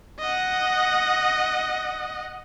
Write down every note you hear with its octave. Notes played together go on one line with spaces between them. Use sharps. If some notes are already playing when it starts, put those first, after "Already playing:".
D#5 F#5